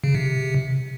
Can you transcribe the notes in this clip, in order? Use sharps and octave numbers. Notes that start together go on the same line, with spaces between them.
C#3
C3